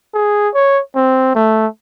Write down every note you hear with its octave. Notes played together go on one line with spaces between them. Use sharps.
G#4
C#5
C4
A3